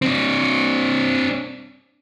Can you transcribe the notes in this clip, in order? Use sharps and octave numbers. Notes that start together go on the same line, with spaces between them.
C4 D4